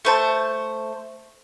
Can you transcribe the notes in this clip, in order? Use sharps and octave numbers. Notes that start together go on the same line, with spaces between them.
A3 C5 A5